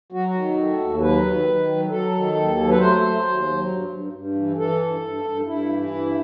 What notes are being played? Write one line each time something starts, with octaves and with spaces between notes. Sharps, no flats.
F#3 F#4
D#3
A3
D#2
F#3 B4
D#3
D#3
F#3
F#3 A4
D#3
D#2
F#3
B4
A3 C5
F#3
D#2
F#3
G2
G2
G2
E3
E3 A4
G2
G2
G2
G2 E4
E3
G2